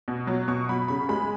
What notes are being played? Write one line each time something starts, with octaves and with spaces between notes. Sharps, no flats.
B2
F#3
B2 C#6
F#3 B5
C#3 B5
G#3 B5